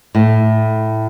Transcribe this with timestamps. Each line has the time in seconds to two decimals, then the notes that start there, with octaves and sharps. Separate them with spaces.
0.15 A2